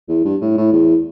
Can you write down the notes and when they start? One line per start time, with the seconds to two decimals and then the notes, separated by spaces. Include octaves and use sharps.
0.09 E2
0.25 G2
0.41 A2
0.57 A2
0.72 E2